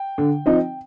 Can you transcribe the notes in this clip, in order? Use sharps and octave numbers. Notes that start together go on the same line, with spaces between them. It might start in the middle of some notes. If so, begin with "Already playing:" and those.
Already playing: G5
D3
F3 C4 D#4